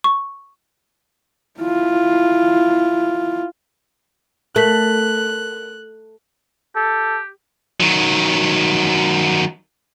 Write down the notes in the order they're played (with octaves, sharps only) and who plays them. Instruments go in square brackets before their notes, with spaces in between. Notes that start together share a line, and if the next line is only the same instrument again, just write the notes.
[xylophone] C#6
[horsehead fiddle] E4 F4
[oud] A3 [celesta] A#4 B6 F#7 [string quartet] F#6
[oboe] G4 [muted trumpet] A4
[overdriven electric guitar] D#3 F#3